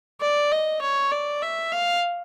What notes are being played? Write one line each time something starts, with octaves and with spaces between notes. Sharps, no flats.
D5
D#5
C#5
D5
E5
F5